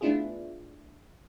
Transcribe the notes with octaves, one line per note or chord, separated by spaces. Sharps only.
A3 B3 D4 E4 F4 G#4